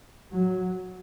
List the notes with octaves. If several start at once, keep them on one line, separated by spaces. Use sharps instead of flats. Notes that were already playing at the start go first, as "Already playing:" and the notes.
F#3